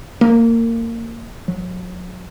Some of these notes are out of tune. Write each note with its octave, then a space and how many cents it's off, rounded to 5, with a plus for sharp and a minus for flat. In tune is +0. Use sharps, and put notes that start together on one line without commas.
A#3 -25
F#3 -40